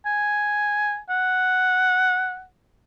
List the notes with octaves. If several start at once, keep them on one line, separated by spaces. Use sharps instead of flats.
G#5
F#5